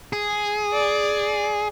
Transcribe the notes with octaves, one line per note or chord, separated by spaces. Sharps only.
G#4
D5